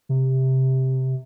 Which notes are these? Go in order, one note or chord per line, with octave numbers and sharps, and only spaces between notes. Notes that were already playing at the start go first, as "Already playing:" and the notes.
C3